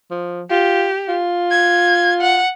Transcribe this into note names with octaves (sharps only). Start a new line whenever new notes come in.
F3
F4 G4
F4
G#6
F#5